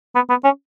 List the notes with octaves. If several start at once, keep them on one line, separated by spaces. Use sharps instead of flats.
B3
B3
C#4